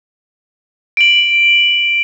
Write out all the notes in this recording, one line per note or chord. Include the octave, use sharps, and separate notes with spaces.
D7 F#7